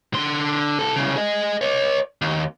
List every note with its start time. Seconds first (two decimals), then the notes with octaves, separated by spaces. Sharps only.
0.14 D3 C6
0.79 C2 A4
0.96 C2 C#3
1.16 G#4 D#5
1.61 C#5 D#5
2.22 D#2